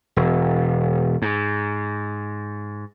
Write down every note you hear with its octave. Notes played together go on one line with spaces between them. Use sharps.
E1
G#2